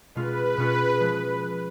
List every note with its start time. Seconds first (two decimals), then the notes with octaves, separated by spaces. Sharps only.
0.14 B2 G#3 C#4 F4 G#4 B4
0.57 B2 G#3 C#4 F4 G#4
1.00 F3 G#3